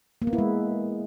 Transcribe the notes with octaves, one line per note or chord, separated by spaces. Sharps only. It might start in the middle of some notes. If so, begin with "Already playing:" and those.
A#3
B3
E4
G#3